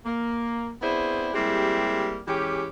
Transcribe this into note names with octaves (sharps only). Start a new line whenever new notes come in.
A#3
B3 C4 D4 E4 G#4 C5
G3 G#3 A#3 C4 E4 G4
E3 G#3 C#4 G4